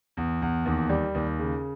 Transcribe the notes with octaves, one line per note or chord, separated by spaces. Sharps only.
E2
E2
D#2
G3
D#2
C#3